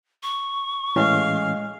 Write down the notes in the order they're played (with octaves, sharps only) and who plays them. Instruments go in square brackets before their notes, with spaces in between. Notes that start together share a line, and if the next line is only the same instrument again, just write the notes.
[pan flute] C#6
[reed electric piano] A2 E3 C#4 [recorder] G#3 [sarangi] F5